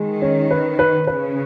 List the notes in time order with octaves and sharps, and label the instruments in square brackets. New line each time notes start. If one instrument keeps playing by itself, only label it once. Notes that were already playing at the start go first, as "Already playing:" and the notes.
Already playing: [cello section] D#3 [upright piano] G#3
[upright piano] C#4
B4
B4
[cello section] C#3 [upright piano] B4